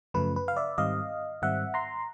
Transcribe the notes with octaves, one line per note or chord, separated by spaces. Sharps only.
F#2 C#3 F3 A3 B4
B4
F5
D5 E5
G#2 D#3 G3 C4 D#5 F5
G#2 D#3 G3 C4 E5 F#5
A#5 C6